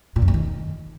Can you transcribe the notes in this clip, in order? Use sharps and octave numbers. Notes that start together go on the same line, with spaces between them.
A#2
F#2
A#2
D#3